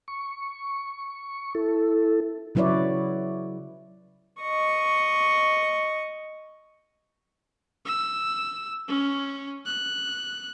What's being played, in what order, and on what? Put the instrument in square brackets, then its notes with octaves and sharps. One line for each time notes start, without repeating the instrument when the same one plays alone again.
[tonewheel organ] C#6
E4 A4
[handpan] C#3 F#3 E4 B4 C#5 D5
[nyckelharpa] D#5 C#6
[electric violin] E6
C#4
F#6